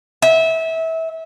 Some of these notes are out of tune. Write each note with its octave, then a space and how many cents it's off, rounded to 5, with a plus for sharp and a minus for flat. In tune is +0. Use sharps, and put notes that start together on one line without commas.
E5 -25